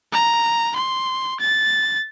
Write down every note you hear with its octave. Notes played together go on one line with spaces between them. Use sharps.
A#5
C6
A6